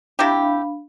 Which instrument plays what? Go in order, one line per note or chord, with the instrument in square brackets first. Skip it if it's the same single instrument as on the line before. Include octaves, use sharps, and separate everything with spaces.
[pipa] C3 E4 G4 [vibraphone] D4 F5 B5